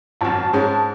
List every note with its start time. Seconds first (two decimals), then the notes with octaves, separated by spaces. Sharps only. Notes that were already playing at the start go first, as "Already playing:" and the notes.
0.21 G#1 F#2 A5
0.53 G#2 G#3 C#4